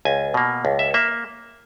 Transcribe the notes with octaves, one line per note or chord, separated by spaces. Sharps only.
C#2 G#5
B2 A#3
C#2
E5
A#3 E5